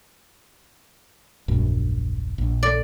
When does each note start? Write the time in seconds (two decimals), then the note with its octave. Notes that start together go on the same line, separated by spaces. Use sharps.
1.48 D#1 A#1 F#2
2.38 A#1
2.63 D5